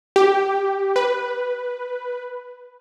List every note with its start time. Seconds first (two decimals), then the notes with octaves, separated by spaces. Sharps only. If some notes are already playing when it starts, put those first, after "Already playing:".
0.16 G4
0.96 B4